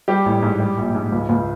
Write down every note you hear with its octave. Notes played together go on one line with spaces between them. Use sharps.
G3 G4
A1
G#2
G3
A#1
G#2
C#2
C#2